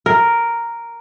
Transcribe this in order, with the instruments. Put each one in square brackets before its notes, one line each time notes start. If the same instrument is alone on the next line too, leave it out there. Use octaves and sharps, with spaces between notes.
[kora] A#4